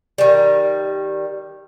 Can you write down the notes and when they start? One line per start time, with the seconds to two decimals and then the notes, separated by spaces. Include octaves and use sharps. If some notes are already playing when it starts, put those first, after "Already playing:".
0.18 D#3 G3